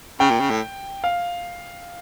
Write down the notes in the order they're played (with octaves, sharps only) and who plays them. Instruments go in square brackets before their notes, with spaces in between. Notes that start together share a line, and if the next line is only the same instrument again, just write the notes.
[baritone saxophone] C#3 [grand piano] G5
[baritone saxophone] A#2
C#3
A2
[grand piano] F5